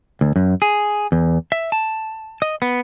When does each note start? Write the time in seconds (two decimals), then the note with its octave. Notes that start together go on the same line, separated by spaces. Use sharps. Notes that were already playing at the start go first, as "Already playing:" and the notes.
0.21 D2
0.36 F#2
0.62 G#4
1.12 E2
1.52 E5
1.72 A5
2.42 D#5
2.62 B3